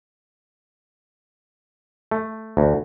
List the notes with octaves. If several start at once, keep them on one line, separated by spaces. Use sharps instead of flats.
A3
D2